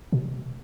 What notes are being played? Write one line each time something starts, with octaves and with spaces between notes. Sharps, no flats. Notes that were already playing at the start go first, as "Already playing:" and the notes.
B2